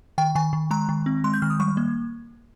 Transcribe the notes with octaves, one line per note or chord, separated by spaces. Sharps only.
D#3 G5
D#3 G#5
D#3
G#3 A#5
D#3
C4
G#3 C6
G6
D#3 F6
D#6
G3 C#6
A#3